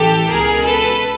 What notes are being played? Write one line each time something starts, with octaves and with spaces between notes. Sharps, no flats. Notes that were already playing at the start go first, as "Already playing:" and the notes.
Already playing: A1 A2 E3 G4 A4
C#2 B2 G#4 A#4
A4 B4